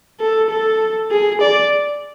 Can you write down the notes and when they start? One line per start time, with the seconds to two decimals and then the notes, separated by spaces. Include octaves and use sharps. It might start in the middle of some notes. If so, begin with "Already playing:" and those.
0.20 A4
0.50 A4
1.11 G#4
1.41 D5